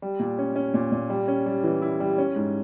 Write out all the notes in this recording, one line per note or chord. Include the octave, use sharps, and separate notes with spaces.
G3
A#2
C#4
C#4
A#2
A#2
G3
C#4
G3
E3
E4
G3
C#4
G#2